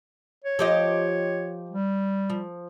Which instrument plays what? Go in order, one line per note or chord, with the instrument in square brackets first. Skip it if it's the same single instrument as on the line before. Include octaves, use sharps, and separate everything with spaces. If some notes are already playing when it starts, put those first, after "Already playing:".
[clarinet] C#5
[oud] F3 G4 D#5
[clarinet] G3
[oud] F3